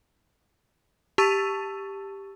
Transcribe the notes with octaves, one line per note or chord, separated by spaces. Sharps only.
G4 A5 C#6 E6 A6 D#7